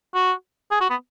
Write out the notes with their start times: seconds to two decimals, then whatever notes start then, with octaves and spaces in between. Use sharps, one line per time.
0.15 F#4
0.71 G#4
0.81 F#4
0.90 B3